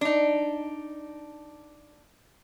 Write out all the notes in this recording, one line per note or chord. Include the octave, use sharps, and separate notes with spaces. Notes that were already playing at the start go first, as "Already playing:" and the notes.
D4 D#4